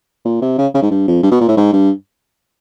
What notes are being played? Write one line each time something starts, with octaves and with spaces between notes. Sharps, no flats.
A#2
C3
C#3
C#3
G#2
G2
F2
G2
B2
A#2
A2
G#2
G2